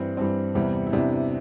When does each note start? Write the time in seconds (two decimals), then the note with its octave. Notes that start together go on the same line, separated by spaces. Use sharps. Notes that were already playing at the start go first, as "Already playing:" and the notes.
Already playing: G2 E3 G3 C4
0.17 G2 E3 G3 C4
0.55 E2 C3 E3 G3
0.87 E4
0.92 E2 C3 E3 G3 D4